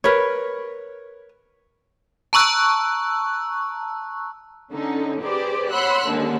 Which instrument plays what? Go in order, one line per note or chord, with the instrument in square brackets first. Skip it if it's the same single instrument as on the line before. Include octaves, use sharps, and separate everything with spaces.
[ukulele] A#4 B4 C#5
[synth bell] A5 A#5 C#6 E6 F#6
[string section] D3 C#4 D#4
G4 G#4 B4 C5 D5
C#5 F#5 B5 C6 E6 F#6
D#2 D3 G#3 C#4